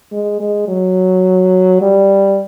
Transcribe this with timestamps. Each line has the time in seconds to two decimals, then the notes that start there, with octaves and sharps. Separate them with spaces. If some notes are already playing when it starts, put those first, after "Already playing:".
0.12 G#3
0.40 G#3
0.68 F#3
1.81 G3